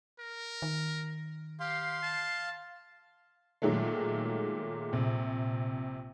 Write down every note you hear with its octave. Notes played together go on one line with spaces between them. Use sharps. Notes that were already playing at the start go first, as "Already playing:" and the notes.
A#4
D#3
G4 F5 C6
A5
A#2 D#3 F#3 G#3 A3
A#1 C3